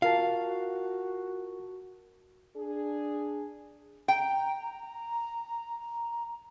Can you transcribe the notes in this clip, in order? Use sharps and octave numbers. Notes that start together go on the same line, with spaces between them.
F4 F#4 A#4 F5 A5
D4 G#4
G5 A#5